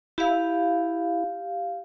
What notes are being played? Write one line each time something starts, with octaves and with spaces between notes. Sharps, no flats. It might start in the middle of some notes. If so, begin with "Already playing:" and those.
E4 G4 F5